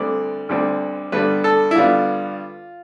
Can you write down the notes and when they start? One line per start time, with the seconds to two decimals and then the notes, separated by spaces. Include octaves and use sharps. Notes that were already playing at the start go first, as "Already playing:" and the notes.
Already playing: D2 D3 G3 C4 D5
0.49 D2 D3 G3 C4
1.12 G2 D3 G3 B3 B4
1.44 A4
1.71 E4
1.76 G2 D3 G3 B3 F4